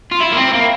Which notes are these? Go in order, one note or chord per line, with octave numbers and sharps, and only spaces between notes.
F4
E4
A#3
C4
A#3